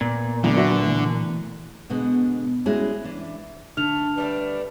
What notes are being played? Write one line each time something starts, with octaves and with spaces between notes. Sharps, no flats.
A#2 B3
E2 D3 F#3
B3 F#4 E5
E3 A3
B2 D3 G#3 B3
G3 G#3 C#4 E4 F#4 G#4
E3 D4
D3 A3 F6 F7
G3 A3 D4 B4